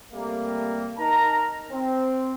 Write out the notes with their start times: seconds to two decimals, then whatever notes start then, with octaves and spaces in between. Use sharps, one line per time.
0.13 C3 G3 A3 A#3
0.98 D#4 A#4 A5 A#5
1.72 C4